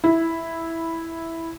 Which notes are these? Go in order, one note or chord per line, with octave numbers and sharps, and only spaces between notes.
E4